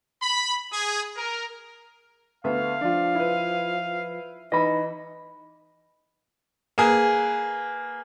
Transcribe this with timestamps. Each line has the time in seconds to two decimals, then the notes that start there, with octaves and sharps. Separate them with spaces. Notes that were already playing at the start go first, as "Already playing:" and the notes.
0.22 B5
0.72 G#4
1.17 A#4
2.44 D2 B3 E5 F5
2.81 F3 D4 F4
3.15 E4 B4
4.52 E3 D#4 D#5 B5
6.78 A#3 G#4 B4